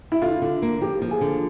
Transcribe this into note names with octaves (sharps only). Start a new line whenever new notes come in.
E4
D3 F4
D3
A#3
F3 G4
F3
G#4
D3